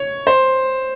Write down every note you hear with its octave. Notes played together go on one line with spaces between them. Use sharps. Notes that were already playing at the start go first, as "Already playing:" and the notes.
Already playing: C#5
C5